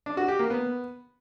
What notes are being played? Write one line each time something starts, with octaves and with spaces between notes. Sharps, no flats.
D4
F#4
G4
A#3
B3